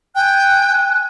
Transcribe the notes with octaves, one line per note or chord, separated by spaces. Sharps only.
G5 G#5 F#6